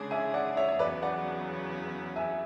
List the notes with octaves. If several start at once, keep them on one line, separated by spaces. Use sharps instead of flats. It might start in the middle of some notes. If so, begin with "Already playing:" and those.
Already playing: C#3 G#3 D4 G#4
E5 G#5
D5 F#5
C#5 E5
C#5
E2 C#3 F#3 B3 B4 D5
D5 F#5
E5 G#5